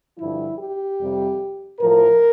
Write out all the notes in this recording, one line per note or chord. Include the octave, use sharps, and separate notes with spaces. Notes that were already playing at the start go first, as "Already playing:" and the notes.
G2 D3 F3 E4
G4
F2 C3 G3
A2 F3 A#4